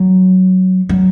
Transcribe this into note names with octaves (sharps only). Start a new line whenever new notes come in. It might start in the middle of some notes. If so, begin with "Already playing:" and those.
Already playing: F#3
F#3